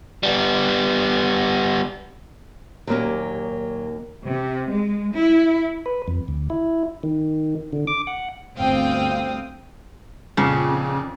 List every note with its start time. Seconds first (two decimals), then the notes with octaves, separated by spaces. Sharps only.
0.23 G3 B3
2.87 D#2 A#2 F#3 A#3 C#4 A#4
4.27 C3
4.69 G#3
5.15 E4
5.86 B4
6.08 F2
6.28 D2
6.50 E4
7.03 D#3
7.73 D3
7.87 D6
8.07 F#5
8.56 G1 D2 C4 F5 G5 D#6
10.37 F2 A#2 C#3